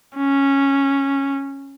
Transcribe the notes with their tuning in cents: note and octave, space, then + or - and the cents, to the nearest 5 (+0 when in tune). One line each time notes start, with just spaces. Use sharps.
C#4 -10